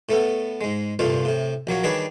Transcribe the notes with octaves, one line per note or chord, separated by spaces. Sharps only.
A2 A3 B3
G#2 G#3
C2 G2 A#2 A3 F4
A2 C3
A#1 F#3 A#3 C#5
D#3 G3 D4 G#4 B4 C#5